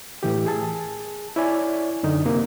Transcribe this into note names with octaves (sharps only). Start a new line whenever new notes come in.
A2 E3 G4
G#4 A5
E4 C#5 D5 G#5
F#2 D3 D#4
C3 A#3